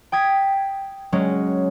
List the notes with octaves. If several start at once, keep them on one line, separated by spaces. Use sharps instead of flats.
G5 D#6 G#6 B6
F#3 G#3 C#4